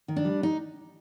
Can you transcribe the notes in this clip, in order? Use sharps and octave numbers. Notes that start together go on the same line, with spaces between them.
D#3
D4
G3
D#4